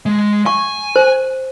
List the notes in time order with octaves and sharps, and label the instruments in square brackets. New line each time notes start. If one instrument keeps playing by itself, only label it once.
[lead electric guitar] G#3
[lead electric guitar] G#5 [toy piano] C#6
[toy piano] C5